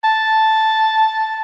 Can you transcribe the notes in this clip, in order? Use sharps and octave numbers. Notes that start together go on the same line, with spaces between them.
A5